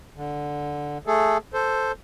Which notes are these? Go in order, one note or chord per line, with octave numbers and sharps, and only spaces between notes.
D3
A3 G#4 A4
A4 C5